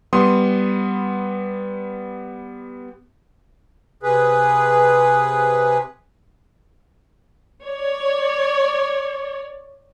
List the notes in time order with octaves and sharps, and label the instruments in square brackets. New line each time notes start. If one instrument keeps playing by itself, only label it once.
[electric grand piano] G3 B3 C6 D#6
[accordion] C3 G#4 B4
[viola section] C#5 D5